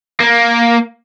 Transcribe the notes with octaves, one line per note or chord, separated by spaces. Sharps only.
A#3